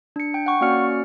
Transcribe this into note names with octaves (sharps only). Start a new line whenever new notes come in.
D4 C#7
G5
F#5 C#6
A#3 C#4 F#4 D5 F6 C#7